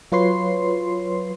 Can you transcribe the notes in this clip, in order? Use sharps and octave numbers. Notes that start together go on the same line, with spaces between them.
F#3 F4 B4 C#5 C6 C7